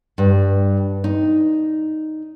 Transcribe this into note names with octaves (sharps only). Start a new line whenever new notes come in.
G2
D#4